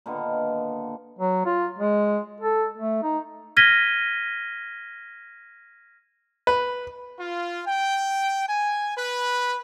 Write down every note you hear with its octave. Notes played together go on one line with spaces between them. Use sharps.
A#2 D3 D#3 B3
F#3
F4
G#3
A4
A3
D#4
F6 G#6 A#6 B6 D#7 G7
B4
F4
G5
G#5
B4